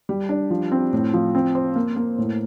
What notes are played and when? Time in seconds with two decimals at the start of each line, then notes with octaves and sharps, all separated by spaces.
0.09 G3
0.29 D4
0.50 F3
0.72 C4
0.93 A2
1.14 F3
1.35 C4
1.55 C5
1.76 A#3
1.96 A#3
2.18 A2